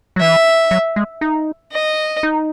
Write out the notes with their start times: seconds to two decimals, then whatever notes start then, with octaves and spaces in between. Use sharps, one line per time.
0.16 F#3
0.21 E3 E5
0.71 F#3
0.96 G#3
1.21 D#4
1.72 D#5
2.23 D#4